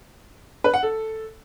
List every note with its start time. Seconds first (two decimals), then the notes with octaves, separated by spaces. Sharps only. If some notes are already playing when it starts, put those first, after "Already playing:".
0.64 B4
0.74 F#5
0.83 A4